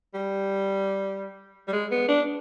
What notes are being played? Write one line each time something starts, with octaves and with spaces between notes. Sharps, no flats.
G3
G3
G#3
B3
D4